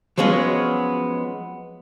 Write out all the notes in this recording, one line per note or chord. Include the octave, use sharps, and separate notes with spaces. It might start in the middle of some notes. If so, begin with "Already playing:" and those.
F3 F#3 G#3 B3 C#4